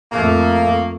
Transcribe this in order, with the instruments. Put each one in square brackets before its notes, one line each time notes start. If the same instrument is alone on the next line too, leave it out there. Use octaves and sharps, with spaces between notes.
[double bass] F2 A3 [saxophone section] A#3